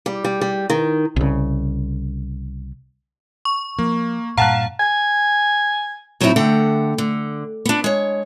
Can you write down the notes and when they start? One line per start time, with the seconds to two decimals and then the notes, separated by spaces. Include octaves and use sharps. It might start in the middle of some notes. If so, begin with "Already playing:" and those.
0.06 G3
0.24 G3
0.41 G3
0.70 D#3
1.16 C2 C#3
3.45 C#6
3.79 F3 A#3
4.37 G2 A#2 F5 F#5 A5 A#5 F#6
4.80 G#5
6.21 A2 F#3 A3 C4 D#4 E4
6.36 D3 A3 F#5 G5
6.98 D3
7.65 B3 D4
7.84 G#3 C#5